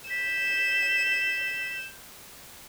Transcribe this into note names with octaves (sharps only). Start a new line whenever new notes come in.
G6 B6 E7